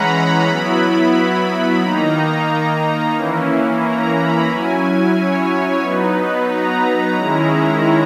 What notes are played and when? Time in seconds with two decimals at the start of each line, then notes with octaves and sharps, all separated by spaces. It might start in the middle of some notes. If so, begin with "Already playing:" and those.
Already playing: E3 G#3 C#4 F#5 A#5 B5
0.14 B5
0.48 F#3 B3 E4
1.81 D#3 A#3 D#4 A#5
3.14 E3 A#3 C#4 E4
3.82 A#5
4.15 B5
4.48 F#3 C#4 E4 G#5
5.15 C#5
5.82 F#3 B3 D#4 B4
6.48 A#5
7.16 D#3 G#3 C#4 E4